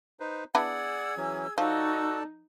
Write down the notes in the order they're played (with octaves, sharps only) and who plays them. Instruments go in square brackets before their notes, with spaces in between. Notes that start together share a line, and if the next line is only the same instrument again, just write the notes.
[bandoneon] D#4 B4 C5
[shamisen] B3 D4 E4 [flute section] G#4 E6 G#6 [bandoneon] D5 F#5
[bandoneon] E3 F#3 C#4
[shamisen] F3 [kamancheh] D#4 [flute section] F#4 C#6 E6 [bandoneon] A4 D5 A5